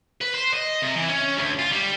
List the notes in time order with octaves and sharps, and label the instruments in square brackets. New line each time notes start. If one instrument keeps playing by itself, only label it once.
[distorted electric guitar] B4
C5
D#5
C3
E3
C#4
D2
F4
G3